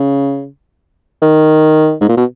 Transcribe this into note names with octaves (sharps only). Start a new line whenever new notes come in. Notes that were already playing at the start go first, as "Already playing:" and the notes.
Already playing: C#3
D#3
G#2
A#2
B2